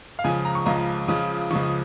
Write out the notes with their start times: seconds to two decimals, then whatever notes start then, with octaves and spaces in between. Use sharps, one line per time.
0.19 F5
0.24 C#2 C#3 F3 G#5
0.45 A#5
0.55 C#6
0.66 C#2 C#3 F3 A#5
1.08 C#2 C#3 F3
1.50 C#2 C#3 F3 C#6
1.63 D#6